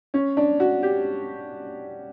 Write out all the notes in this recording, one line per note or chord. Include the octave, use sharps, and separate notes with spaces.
C#4
D4
F#4
G4